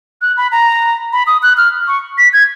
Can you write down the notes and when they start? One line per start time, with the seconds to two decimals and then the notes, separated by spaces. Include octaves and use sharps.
0.22 F#6
0.37 B5
0.52 A#5
1.13 B5
1.27 D#6
1.43 F#6
1.57 F6
1.87 C#6
2.18 B6
2.33 G#6